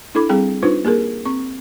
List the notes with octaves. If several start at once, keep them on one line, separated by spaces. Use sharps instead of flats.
D4 E4 A4 B5 D6
G3 C4 G#4 G5
D4 D#4 F4 B4 C5
A#3 G4 G#4 A#4
C4 C#6